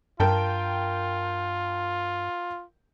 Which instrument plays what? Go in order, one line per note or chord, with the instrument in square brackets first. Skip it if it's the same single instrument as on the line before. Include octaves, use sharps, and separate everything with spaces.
[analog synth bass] G2 [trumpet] F4 [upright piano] A#4 G5 A5